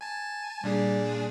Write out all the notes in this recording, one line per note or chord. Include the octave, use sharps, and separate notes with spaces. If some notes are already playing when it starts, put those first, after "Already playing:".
G#5 A5
A#2 G3 D4 G#4
G3